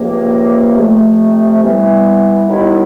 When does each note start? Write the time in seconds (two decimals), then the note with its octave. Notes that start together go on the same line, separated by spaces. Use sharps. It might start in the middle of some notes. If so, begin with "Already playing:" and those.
Already playing: C#2 C3 F3 A#3
0.76 F2 C3 F3 A3
1.63 E3 G3 B3
2.48 D#2 D#3 G3 B3 E4